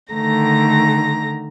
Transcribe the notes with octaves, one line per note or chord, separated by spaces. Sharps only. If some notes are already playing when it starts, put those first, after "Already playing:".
D3 D#3 A3 A#5 A#6